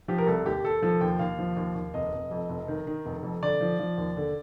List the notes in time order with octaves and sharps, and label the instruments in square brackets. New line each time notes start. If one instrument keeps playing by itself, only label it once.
[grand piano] F3 G4
A#4
C2 A4
D#2 G4
D#2 A4
F3 A4
D#2 G5
D#2 F5
F3
D#2
D#2
F1 D#5
F1
F2
F1
D#3
D#3
F1
F2
D3 D5
F3
F3
D#2
D3